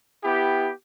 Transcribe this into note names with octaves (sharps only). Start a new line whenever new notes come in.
B3 E4 G4